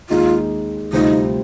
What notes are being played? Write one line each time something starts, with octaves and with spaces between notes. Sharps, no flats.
D#2 D#3 G#3 D#4 F4
D2 C3 G3 C4 D#4 F4